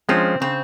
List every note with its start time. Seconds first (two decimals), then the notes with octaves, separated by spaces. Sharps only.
0.09 F3 G#3 C4 C#4 F4
0.41 C#3 C4